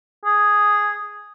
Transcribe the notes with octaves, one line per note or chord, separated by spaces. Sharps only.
G#4